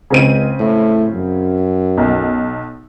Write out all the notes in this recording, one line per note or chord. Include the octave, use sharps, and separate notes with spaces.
C#2 C#3 C4 D#7
A2
F#2
B1